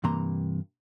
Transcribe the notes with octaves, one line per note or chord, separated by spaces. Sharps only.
G2 C3 E3 A#3 A#5 C6